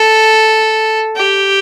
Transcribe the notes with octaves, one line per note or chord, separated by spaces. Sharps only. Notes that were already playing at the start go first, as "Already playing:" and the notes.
Already playing: A4
G4